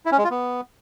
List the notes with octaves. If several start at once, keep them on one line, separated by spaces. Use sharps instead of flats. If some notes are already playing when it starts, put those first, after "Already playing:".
E4
C#4
G#3
F4
B3